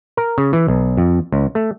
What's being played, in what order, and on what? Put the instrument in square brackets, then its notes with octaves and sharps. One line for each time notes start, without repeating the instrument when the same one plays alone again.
[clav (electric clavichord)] A#4
C#3
E3
B1
F2
C#2
A3